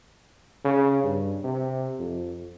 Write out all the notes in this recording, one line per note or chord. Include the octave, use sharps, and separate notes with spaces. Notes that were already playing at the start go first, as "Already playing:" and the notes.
C#3
G2
C3
F2